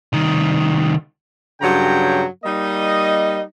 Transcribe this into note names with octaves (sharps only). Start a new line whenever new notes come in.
C2 D#3
G2 C#3 F#3 G5 A#5
G3 A#3 D#4 D#5